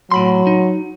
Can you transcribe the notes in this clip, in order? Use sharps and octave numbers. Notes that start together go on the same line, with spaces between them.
A2 F#3 B5 C6
D#4